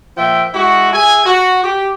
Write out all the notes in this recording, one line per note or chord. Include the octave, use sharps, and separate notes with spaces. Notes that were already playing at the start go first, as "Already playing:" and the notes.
A#2 F3 E5 G5
G#3 E4 F#4
G#4 E5 G#5
F#4
G4